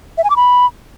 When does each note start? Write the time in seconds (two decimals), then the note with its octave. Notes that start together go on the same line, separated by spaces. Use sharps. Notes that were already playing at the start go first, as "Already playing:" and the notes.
0.18 E5
0.24 G#5
0.30 D6
0.36 B5